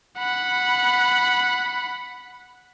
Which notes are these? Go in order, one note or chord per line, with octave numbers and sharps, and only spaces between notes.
F#5 B5